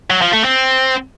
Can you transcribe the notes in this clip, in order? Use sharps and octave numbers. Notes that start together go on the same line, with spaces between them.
F#3
F3
A3
C4